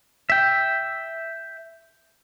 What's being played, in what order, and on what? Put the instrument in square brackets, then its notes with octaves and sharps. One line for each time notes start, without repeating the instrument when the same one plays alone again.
[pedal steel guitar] E5 G5